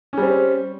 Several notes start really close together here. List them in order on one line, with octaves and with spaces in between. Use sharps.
C#4 G3 C4